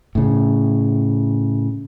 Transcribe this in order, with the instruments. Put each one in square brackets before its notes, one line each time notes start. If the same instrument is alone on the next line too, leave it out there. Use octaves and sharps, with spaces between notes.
[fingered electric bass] A2 C#3